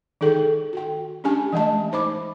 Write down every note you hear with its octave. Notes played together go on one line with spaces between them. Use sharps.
D#3 D#4 G#4 A4 G5
F#4 G5
C#4 D4 G4 G#5 A5
E3 G#3 A3 D#5 E5 A5
D#4 C5 B5 D6